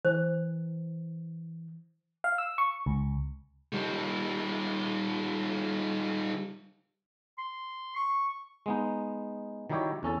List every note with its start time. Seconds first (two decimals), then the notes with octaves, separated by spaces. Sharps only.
0.05 E3 C5
2.24 F5
2.38 E6
2.58 C#6
2.86 C#2
3.73 D#3 G3
7.38 C6
7.96 C#6
8.66 G#3 B3 D#4
9.70 D#3 F#3 G3 E4 G4 C#5
10.03 E2 C#4 A4 A5